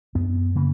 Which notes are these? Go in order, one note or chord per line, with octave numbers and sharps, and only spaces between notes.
F#2 B3
C#3 A#3